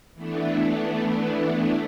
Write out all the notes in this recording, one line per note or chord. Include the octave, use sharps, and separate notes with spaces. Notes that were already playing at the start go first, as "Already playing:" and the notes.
E3 A3 B3 D4